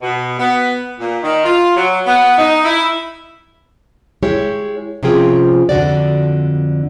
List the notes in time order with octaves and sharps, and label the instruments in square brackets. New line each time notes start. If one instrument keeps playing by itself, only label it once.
[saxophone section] B2
B3
A#2
D#3
F4
F#3
B3
D#4
E4
[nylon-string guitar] G#3 E4 G4 C#5
C3 F3 C#4 F4 G#4 G5
F2 D3 F#4 D5